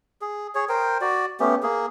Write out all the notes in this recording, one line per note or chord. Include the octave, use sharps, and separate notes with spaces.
G#4
G#4 C#5
A#4 C5 G5
F#4 D5
A3 B3 C#4 G4
A#3 G#4